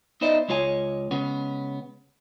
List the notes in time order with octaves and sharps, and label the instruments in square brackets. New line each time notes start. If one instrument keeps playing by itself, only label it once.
[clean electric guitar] B3 D#4 E4 C5 D5 D#5
C#2 G#3 F4 C#5 F5 G#5
C#3 G#3 B3 C#4